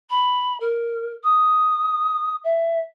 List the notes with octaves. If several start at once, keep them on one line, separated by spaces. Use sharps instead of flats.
B5
A#4
D#6
E5